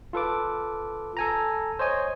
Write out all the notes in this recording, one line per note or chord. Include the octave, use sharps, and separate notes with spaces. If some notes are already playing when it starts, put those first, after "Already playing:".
F4 A4 B4 D6
A4 G#5 A#5
C5 C#5 D#5 G#5